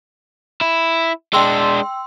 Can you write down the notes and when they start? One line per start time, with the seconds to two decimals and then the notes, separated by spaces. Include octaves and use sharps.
0.61 E4
1.33 G#3 D4 G5 C6 E6